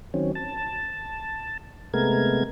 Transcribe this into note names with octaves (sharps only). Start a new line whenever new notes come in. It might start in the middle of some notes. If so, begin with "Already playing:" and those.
D#3 F#3 C4 C#4
A5
C3 G#3 A3 B3 A#4 G#6